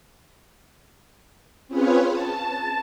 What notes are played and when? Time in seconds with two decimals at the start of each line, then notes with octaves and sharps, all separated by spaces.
1.67 C4 C#4 F4 G#4 B4 C#5
2.09 A5